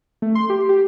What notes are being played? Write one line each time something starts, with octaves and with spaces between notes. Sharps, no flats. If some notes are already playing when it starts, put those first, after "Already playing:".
A3
C6
G4
G4